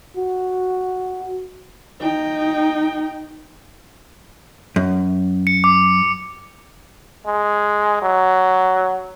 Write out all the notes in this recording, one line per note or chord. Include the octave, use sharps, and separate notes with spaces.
F#4
D#4 G5
F#2
C#7
D6
G#3
F#3